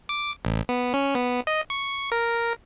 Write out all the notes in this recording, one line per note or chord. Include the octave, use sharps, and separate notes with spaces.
D6
A1
B3
C#4
B3
D#5
C#6
A#4